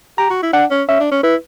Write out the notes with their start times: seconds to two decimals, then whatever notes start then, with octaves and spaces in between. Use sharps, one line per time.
0.18 G4 A#5
0.30 F#4
0.43 E4
0.53 D4 F#5
0.71 C#4
0.88 C#4 E5
1.00 D4
1.11 C#4
1.23 E4 B4